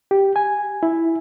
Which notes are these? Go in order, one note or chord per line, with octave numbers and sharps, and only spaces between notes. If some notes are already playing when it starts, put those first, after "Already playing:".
G4
G#5
E4